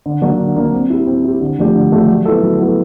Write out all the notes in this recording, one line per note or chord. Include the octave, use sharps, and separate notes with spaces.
D3
F#3 A#3 D4 F#4
D3
F#3 A#3 D4 F#4
C4
E4 G4
C4
E4 G4
D3
F3 A3 D4 G4
D3
F3 A3 D4 G4
F#3
B3 E4 A4
F#3
B3 E4 A4